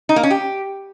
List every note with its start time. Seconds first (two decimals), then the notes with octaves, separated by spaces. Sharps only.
0.09 D#4
0.16 A#3
0.23 C#4
0.30 G4